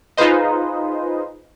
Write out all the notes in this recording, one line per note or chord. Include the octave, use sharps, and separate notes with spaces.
D#4 F4 G#4 B4 C5 D#5